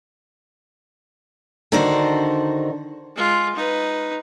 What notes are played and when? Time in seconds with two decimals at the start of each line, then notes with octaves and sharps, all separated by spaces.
1.72 D3 D#3 D4 D#4 F#4 C5
3.16 G#3 F4
3.55 D#4 B4